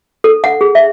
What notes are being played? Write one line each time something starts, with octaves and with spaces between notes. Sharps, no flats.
A4
F#5
G#4
E5